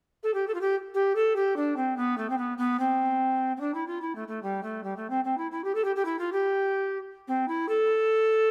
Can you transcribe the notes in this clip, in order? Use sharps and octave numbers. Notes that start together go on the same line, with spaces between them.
A4
G4
A4
F4
G4
G4
A4
G4
D4
C4
B3
A3
C4
B3
B3
C4
C4
D4
E4
F4
E4
A3
A3
G3
A3
G3
A3
C4
C4
E4
E4
G4
A4
G4
G4
E4
F4
G4
C4
E4
A4